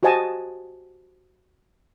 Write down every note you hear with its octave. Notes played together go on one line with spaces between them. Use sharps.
F#4 G4 C5 D#5 G#5 A5